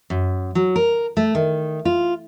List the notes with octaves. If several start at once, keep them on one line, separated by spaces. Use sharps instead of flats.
F#2
F#3
A#4
A3
D#3
F4